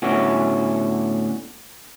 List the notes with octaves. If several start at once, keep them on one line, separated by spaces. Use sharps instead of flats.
A2 D3 A3 B3 C#4 F#4